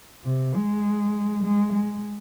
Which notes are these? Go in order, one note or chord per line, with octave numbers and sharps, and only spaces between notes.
C3
G#3
G#3
G#3